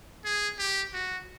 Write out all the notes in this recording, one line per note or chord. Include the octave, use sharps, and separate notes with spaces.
G#4
G4
F#4